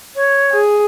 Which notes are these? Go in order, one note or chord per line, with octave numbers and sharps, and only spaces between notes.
C#5
G#4